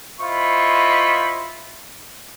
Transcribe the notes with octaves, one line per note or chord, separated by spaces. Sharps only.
E4 F4 C5 D#5 B5 C#6